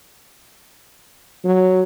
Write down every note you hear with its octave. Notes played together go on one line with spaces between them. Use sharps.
F#3